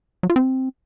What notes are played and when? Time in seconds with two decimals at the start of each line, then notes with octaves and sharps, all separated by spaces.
0.23 F#3
0.30 F4
0.36 C4